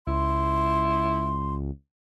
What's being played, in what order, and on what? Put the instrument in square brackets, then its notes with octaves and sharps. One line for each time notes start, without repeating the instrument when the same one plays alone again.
[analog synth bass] C#2 [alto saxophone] E4 [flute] C6